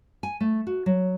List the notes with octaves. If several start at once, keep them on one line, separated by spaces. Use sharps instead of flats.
G#5
A3
F#4
F#3